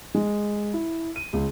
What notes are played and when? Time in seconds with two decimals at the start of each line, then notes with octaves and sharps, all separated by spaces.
0.15 G#3
0.74 E4
1.16 D#7
1.33 C#2